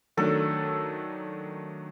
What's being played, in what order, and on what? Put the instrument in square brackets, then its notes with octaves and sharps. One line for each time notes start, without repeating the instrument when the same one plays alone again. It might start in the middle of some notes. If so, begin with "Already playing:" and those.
[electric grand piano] D#3 F#3 A3 D4 [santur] A4